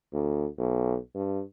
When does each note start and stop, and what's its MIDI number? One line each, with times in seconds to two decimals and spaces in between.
0.13 0.46 38
0.58 0.96 35
1.15 1.42 43